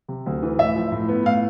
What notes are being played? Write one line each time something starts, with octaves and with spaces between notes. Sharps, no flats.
C3
D2
E3
A2 E5
F3
A2
B3
A2 F5